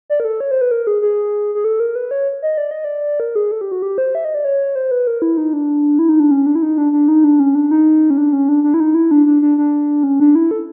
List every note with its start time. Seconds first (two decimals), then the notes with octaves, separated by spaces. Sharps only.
0.10 D5
0.20 A#4
0.25 A4
0.40 C#5
0.51 C5
0.61 B4
0.71 A#4
0.87 G#4
1.02 G#4
1.55 G#4
1.64 A4
1.80 A#4
1.95 B4
2.11 C#5
2.42 D#5
2.58 D5
2.71 D#5
2.84 D5
3.20 A#4
3.36 G#4
3.51 A4
3.61 G4
3.72 F#4
3.82 G4
3.98 C5
4.15 E5
4.25 D#5
4.34 D5
4.45 C#5
4.75 C5
4.91 B4
5.07 A#4
5.22 E4
5.37 D#4
5.53 D4
5.99 E4
6.09 D#4
6.20 D4
6.31 C#4
6.46 D4
6.55 E4
6.62 D#4
6.78 D4
6.93 D4
7.08 D#4
7.24 D4
7.40 C#4
7.55 D4
7.71 D#4
8.10 C#4
8.17 D4
8.33 C#4
8.49 D4
8.64 D4
8.74 E4
8.80 D#4
8.95 E4
9.11 D4
9.26 D4
9.42 D4
9.58 D4
10.03 C#4
10.20 D4
10.35 E4
10.51 A4